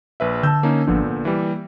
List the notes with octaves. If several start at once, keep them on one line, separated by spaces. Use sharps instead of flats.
A#1 B4 E5
D3 A5 E6 G6
A#3 C#4 D#4
G#1 A#2 D3 F3 B3 D4
A#3
E3 G3